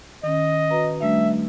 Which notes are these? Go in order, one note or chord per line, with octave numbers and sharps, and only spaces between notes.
D#3 C#4 D#5
F#4 B4 A#5
G3 A3 D4 E5